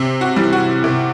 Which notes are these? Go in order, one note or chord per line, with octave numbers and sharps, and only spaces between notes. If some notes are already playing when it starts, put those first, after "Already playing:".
Already playing: C3
F#4
E3 G3
F#4
C3